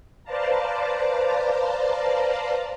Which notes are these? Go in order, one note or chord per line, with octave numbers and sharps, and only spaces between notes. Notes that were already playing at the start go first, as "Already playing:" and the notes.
B4 C5 D5 F5 A5 A#5